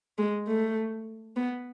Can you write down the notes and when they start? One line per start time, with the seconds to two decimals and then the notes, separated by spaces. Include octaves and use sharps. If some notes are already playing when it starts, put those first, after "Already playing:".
0.18 G#3
0.48 A3
1.36 B3